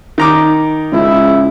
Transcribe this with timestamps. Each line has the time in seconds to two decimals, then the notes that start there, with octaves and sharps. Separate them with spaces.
0.18 D#3 A#5 D6
0.92 C#2 C#3 E4